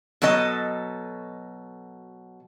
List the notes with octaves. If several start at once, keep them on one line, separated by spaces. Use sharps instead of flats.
B2 F#3 A4 D#5